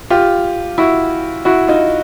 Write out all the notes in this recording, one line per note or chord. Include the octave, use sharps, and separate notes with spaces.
F4 G4
E4 F#4
E4 F#4
D#4 F4